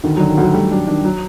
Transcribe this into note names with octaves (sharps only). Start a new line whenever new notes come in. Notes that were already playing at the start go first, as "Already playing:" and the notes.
D2 D#3
D3 F#3
D#3
D2 F#3
G3 A3
F#3 D4
D#3 D4
F#3